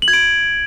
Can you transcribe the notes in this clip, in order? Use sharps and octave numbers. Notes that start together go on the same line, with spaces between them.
F#7
G#6
D7